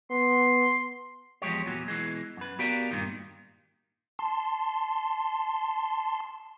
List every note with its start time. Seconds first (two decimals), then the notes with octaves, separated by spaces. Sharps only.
0.11 B3 C6
1.42 E2 F3 G#3 G4 C#5
1.66 E2 A#2 F#3
1.88 B2 E3 G#3
2.37 F#2 B4
2.59 B3 F#4 G4 A#4 D5 F5
2.91 G2 A#2 D#3
4.19 A5 C6